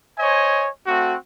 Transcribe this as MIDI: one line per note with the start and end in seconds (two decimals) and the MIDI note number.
0.19 0.68 72
0.19 0.68 73
0.19 0.68 75
0.19 0.68 80
0.86 1.14 57
0.86 1.14 60
0.86 1.14 66